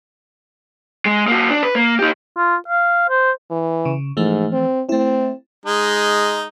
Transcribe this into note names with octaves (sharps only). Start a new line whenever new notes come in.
G#3
A#3 F#4
D4
B4
A#3
D#4 G4
F4
F5
C5
E3
C#3
G#2 E3 F3 A3
C4
A3 C4 E4
G#3 D#4